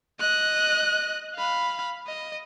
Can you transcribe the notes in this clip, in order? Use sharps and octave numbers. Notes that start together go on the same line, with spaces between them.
D#5 F#6
F5 B5
D#5